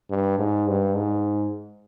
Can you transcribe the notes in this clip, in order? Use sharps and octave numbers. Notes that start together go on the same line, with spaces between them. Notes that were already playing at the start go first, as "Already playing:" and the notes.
G2
G#2
G2
G#2